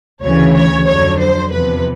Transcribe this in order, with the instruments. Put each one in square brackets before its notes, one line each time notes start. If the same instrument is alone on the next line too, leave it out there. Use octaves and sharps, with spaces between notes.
[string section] D2 C#3 E3 C#5
C#5
F2 D3 F#3 C#5
C5
E2 C3 F3 B4